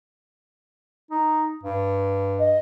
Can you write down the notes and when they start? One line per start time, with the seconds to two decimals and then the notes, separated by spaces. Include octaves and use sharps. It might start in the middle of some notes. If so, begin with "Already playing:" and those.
1.11 D#4
1.64 G2
2.39 D#5